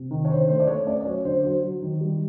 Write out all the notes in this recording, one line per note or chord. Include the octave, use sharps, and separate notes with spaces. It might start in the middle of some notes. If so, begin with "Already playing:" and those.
Already playing: C3
D#3
C#5
D3 C5
A3 C5
D5
A3 C#5
C#4 D5
D5
F#3 C#5
D3 C5
F#3 C5
F#3
D#3
G3